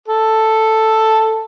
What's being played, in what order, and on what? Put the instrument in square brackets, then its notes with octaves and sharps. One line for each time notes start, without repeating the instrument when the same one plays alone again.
[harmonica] A4